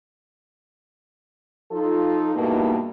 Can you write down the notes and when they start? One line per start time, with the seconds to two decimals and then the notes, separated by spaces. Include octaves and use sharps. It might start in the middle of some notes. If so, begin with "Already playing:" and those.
1.72 F3 D#4 F4 A4
2.36 G2 B2 G#3 A#3 D#4 E4